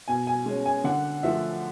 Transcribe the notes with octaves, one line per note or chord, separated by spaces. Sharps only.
B2 G#5
G#5
G#3 C#4
G#5
D3 F#5
F3 A3 E5